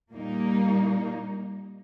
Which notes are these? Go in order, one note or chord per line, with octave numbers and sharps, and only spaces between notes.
A#2 G3 A#3 D#4